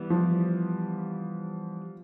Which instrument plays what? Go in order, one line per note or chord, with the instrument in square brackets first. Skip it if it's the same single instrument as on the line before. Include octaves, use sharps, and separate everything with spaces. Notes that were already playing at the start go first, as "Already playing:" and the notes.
Already playing: [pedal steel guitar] E3 G3 B3
[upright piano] F3